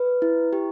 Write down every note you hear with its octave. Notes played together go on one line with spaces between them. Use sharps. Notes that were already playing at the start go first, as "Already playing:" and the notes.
Already playing: B4
E4
G4